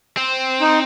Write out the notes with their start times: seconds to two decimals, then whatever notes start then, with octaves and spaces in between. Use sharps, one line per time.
0.17 C4
0.61 D#4